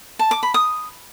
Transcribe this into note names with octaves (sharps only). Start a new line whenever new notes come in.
A5
D6
B5
D#6